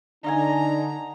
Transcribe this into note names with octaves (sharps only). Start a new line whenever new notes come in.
D3 D4 D#4 D#5 F5 G#5 A#5